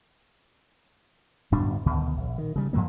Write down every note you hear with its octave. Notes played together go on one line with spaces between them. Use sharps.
D1 G2 B2 D4
D2 B2 D#3
A#1
D#3
C#3 G3
G2 F3 F#3 A#3